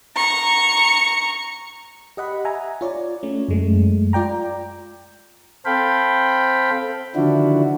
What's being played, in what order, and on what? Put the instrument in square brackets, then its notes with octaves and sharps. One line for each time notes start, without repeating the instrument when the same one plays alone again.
[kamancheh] A#5 C#6
[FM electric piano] G4 D#5 F#5 B5
E5 G#5 A#5
F4 C#5 D5
A3 C#4
F#2 G#3 A3
F4 D5 G5 A#5
[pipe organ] C4 A4 C5 F5 G5 B5
D3 D#3 F3 D4 E4 F#4